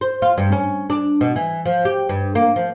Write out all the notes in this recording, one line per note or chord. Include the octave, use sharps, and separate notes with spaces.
C5
F4
G2
C#4
D4
B2
E3
F3
G4
G2
A#3
F3